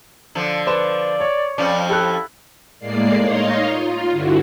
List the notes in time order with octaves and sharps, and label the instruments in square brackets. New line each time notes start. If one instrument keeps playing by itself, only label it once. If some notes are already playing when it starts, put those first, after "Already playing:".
[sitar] D3 F3
[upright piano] B4 C5 E7 [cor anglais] D5
[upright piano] C#5
[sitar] F2 F3 C#4 [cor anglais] D5
[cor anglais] E4 [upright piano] G4 A4 F#6
[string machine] A2 G#3 A#3 D5 C7
D#4 C#5 D#5 F5 A#5 C6
F4
G2 D3 E4 F#4